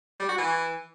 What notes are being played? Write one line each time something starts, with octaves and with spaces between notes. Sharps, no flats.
G3
F#4
E3